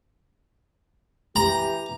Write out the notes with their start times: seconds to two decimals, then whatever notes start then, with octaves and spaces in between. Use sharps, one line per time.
1.36 E3 G4 A#5